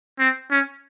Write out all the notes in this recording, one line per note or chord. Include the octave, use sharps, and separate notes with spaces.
C4
C#4